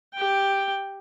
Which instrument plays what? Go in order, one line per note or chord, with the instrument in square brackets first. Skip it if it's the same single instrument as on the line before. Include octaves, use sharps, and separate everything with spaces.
[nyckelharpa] G4 G5